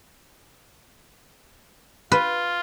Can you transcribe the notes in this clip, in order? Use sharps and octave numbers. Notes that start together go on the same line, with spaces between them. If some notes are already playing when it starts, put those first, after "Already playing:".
F4 B4